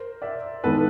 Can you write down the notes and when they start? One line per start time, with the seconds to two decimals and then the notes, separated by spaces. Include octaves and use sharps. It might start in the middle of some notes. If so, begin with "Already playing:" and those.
Already playing: A#4 C5
0.22 D5 E5
0.64 D#3 G#3 B3 E4 A4 B4